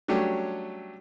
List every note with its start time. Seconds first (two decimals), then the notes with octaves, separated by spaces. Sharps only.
0.08 F#3 G3 A3 C#4 D4 G4